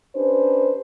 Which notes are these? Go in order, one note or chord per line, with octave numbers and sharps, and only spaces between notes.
C#4 D4 G4 B4 C5